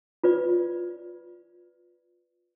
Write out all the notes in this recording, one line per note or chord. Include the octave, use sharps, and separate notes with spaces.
F4 B4 D5